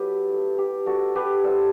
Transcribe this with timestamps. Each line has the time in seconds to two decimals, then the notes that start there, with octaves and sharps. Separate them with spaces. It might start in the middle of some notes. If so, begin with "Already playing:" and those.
Already playing: F#3 B3 E4 G4 A4 B4
0.29 A3 E4
0.58 G4
0.86 G3 D4 F#4 A4
1.15 G4 B4
1.44 G3 B3 E4 A4 C5